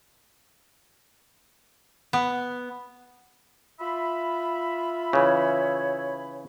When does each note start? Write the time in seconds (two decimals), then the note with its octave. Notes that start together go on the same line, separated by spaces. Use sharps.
2.13 B3
3.80 F4 E5 B5
5.13 C#3 E3 C#5